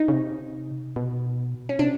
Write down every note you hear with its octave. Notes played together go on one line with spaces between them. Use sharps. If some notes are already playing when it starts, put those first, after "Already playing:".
Already playing: D#4
C#3
C3
B2
C#4
C3 D4